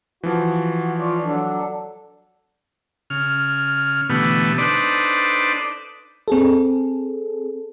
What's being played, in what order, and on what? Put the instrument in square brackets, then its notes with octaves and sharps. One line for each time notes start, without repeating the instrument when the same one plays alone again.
[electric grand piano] E3 F3 [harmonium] F#4
[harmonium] F4 C#5 D5
F#3 D4 A4
[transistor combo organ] C#3 F6
B2 D3 E3 G3 A3 B3
D4 D#4 A4 B4 C5 D5
[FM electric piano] C4 G#4 A4